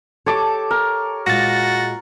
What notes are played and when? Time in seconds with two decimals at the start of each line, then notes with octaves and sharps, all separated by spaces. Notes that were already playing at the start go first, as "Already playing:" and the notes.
0.26 G4 A4 C#5 A5 D6
0.71 A#4
1.27 A#2 G#3 F#4 A6 A#6